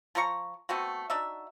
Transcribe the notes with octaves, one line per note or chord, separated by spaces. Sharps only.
F3 A#4 A#5 C#6
A3 B3 C4 F#4
D4 D#4 F#4 E5